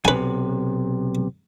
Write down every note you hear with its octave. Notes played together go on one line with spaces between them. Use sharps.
B1 C3 B4 G#5